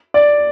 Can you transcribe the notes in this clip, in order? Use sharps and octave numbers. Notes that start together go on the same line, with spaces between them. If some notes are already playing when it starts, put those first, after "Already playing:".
D5